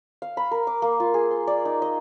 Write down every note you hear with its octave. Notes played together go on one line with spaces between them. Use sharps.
F5
B5
A#4
D6
A#3
F4
G#4
C6
D5
D#4
D#5